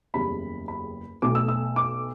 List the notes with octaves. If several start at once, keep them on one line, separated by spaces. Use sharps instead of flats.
F#1 E2 C#3 G3 B5
B5
B1 B2 A3 D6
E6
E6
D6